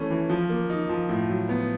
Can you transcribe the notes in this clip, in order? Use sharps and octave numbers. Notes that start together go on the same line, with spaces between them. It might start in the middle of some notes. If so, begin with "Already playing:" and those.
Already playing: E3 A3 C#4
E3
F3
A#3
D#4
F3
A2
F#3
B3